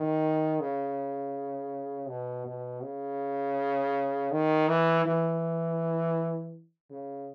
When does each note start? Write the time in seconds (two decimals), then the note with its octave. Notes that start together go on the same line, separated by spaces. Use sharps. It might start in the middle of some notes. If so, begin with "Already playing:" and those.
Already playing: D#3
0.60 C#3
2.09 B2
2.46 B2
2.83 C#3
4.32 D#3
4.68 E3
5.05 E3
6.91 C#3